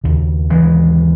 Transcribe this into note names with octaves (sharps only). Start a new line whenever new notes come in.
D#2 C#3
E3 G#3